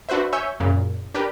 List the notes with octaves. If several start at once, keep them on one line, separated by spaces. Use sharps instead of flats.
D4 F#4 B4 C5 E5
C#5 E5 G#5 C#6 E6 G6
F#2 A#2 C#3
D4 G4 A#4 B4